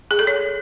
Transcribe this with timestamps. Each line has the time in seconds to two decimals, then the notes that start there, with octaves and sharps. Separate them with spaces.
0.11 G#4
0.19 A4
0.27 C#5